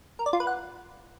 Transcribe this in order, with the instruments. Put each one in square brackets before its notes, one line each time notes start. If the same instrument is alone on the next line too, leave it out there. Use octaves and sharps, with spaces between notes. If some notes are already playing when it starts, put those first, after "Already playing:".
[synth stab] A#4
D5
F4
B4
F#5